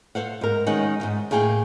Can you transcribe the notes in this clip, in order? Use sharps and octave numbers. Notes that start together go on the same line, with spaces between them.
A4 C5 F5 F#5
G#2 A#4
D#3 G#3 C#4 D#4 F#5
D#2 G#2
A2 A#3 G#4 F5 G5